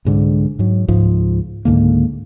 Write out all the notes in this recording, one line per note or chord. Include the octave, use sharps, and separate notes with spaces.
C2 G#2 D3
G#2 F#3
C#2 G#2 F3
C#2 G#2 D3 A#3